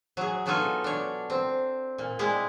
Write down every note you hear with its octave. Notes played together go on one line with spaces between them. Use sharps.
F#3 G#4
B2 F#3 D#4 F4 A4 G#5
D4 C#5
C4
A#2
G3 G#3 E4